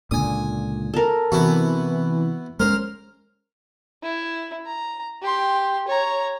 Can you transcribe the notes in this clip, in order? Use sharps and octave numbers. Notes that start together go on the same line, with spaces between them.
C#2 A#2 D3 G#5 D#6
A4 A#4
C3 E3 B3 E4 F#4
G#3 B3 C#4 A#4 C5 F6
E4
A#5
G4 C6
C#5 A#5